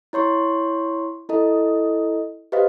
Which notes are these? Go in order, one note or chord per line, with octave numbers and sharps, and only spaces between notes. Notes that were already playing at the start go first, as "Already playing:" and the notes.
E4 C#5 C6 C#6
E4 A4 D#5
G4 B4 C5 D#5 F5